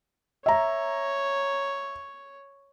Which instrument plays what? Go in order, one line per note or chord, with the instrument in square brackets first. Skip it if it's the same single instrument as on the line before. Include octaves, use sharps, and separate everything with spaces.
[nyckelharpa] C#5 [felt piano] E5 A#5